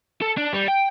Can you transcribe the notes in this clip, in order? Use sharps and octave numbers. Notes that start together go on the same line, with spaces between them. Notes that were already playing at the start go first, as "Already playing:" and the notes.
A4
D4
G3
G5